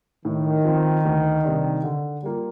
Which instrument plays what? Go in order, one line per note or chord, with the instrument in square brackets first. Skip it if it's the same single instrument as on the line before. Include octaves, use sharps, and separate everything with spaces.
[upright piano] A2 [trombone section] D#3
[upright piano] F3 C4
D2
C3 G3 D4
D3
G3 A#3 F4